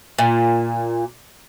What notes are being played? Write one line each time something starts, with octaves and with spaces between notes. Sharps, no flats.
A#2